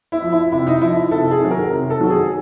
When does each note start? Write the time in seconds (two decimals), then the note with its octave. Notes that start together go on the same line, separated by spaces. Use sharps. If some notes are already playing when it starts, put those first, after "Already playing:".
0.12 E4
0.22 F3
0.32 E4
0.52 C3 E4
0.67 D#4
0.82 F3 E4
0.96 E4
1.11 C3 A4
1.31 G#4
1.41 D#3 F#3
1.51 A#4
1.71 C3
1.90 A4
2.00 D#3 F#3
2.10 G#4